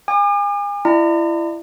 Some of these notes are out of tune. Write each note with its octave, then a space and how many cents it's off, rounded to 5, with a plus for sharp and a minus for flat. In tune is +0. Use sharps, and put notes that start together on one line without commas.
G#5 -35 D6 +45
E4 +30 D5 +40 A#5 -30